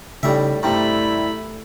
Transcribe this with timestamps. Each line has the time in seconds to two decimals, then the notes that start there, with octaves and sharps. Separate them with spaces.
0.23 A2 C#3 G3 A3 D#4 E5
0.63 G2 C3 G3 A3 E4 A#5 B5